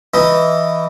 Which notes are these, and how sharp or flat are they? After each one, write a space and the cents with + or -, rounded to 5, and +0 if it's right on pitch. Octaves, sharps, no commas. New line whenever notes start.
E3 +0 D#4 +0